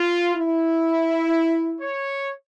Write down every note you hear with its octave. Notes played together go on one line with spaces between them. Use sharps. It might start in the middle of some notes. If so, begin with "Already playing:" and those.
Already playing: F4
E4
C#5